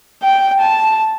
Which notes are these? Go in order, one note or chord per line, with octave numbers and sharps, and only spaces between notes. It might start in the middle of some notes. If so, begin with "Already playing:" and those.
G5
A5